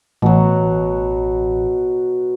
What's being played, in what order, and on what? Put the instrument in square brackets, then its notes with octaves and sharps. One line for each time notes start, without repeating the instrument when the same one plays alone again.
[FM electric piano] A1 [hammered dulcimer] B2 F#3